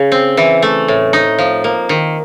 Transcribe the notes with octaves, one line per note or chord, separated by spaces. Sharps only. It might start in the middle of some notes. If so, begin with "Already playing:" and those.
Already playing: C#3
C4
E3
A3
A2
D#4
F3
A#3
D#3